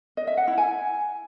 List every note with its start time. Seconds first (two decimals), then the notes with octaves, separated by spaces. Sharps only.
0.17 D#5
0.27 E5
0.37 F#5
0.48 E4
0.58 G#5